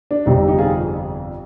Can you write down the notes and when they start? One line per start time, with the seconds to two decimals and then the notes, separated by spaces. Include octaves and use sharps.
0.11 D4
0.26 G1 F2 C3 G3 D#4
0.48 D#4 G4
0.58 F4 G#4